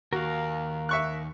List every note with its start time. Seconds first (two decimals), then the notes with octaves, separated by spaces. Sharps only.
0.13 D#2 F#4 A#4 F5
0.89 E5 C#6 F#6